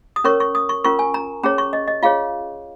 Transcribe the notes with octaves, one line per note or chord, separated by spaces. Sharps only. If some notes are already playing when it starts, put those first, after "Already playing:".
D#6
C#4 A#4 C#5 C#6
C#6
D#6
C#6
C#4 F4 A#4 C#6
G#5
A#5
C#4 G#4 C#5 A#5
C#6
D#5
D#5
F4 G#4 C#5 F5